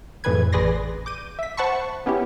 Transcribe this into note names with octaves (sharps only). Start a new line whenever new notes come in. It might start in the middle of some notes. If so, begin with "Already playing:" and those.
F2 A2 E3 G#4 B4 G#6
A1 G#4 B4 D5 C6 A#6
D6 G6 D#7
E5 B6
C5 F#5 A5 B5 C#6
B3 C#4 E4 G4